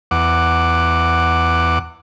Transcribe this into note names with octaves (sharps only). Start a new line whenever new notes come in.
E2 F#5 D6